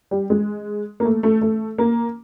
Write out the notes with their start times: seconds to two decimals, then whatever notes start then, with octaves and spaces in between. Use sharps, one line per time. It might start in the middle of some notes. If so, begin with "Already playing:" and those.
0.11 G3
0.30 G#3
1.00 A#3
1.05 A3
1.23 A3
1.41 A3
1.78 A#3